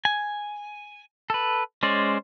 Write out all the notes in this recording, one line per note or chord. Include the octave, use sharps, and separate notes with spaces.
G#5
A4 B4
G#3 C#4 C5 D5